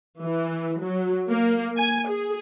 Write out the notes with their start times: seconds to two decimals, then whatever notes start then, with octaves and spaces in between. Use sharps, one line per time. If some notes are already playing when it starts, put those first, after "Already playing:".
0.21 E3
0.81 F#3
1.30 A#3
1.78 G#5
2.10 G#4